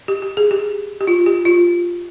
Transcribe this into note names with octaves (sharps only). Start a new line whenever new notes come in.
G4
G4
G#4
G4
G4
F4
G4
F4